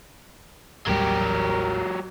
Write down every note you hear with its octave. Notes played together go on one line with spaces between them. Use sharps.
A1 D#2 F#3 G3 G4 A#4